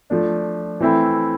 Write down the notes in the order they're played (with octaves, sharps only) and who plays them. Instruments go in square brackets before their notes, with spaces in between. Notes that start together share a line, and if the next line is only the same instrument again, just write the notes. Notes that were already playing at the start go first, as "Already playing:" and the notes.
[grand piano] F3 A3 D4
E3 A3 C4 E4